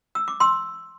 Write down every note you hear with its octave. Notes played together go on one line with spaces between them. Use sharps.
E6
D6
C6 E6